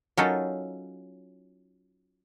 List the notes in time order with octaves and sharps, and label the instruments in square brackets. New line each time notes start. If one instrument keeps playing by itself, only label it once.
[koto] F#3 C#4 D#4 F4 A4 A#4